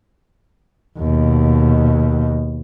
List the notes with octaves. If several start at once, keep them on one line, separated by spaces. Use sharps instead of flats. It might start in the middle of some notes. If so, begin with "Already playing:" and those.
D#2 B2